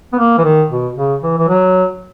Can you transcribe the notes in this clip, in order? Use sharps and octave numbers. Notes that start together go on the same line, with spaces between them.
B3
A#3
E3
D#3
B2
C#3
E3
E3
F#3